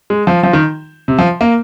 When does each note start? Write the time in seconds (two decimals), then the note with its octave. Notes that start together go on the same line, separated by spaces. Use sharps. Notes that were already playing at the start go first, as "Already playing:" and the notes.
0.10 G#3
0.27 F3
0.43 F3
0.53 D#3
1.08 C3
1.19 F3
1.41 A#3